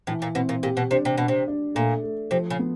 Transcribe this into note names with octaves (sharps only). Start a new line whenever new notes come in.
A2 E3
A#2
B2 C4
A#2
A#2 G4
B2
C3 D4
C3
B2 D4
C3
D4
A#2 A3
A3
C3 F3
C#3
B3